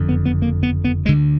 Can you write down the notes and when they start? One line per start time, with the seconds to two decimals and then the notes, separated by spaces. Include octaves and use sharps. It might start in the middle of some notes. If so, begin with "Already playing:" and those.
Already playing: F#1 F2 D3
0.09 B3
0.26 B3
0.42 A#3
0.63 B3
0.84 B3
1.05 D2 G#3
1.09 D3